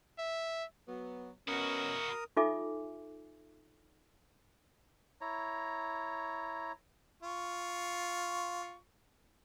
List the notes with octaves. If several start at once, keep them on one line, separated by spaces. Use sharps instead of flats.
E5
F#3 B3
B2 C#4 E4 F#4 A#4 D#6
D#4 F4 A4 E5 G#5 D6
E4 C#5 A#5
F4 C#6